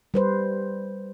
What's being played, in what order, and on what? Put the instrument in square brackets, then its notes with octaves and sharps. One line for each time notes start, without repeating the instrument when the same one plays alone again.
[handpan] G3 B4 C5